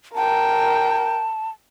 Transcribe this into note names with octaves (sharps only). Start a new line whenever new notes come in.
A#4 G5 A5